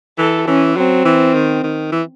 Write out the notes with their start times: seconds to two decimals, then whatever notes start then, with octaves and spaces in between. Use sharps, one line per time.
0.18 E3 A4
0.47 E3 C#4
0.76 F#3 C4
1.05 E3
1.34 D#3
1.64 D#3
1.92 E3